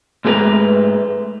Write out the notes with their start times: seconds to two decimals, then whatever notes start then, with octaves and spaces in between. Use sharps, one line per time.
0.25 G#2 G#3 A3 G4 B4 A#5